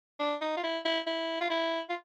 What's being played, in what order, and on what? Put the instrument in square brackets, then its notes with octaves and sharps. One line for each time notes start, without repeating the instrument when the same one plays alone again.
[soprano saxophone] D4
D#4
F4
E4
E4
E4
F4
E4
F4